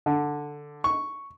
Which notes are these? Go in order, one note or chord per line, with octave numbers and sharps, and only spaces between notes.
D3
C#6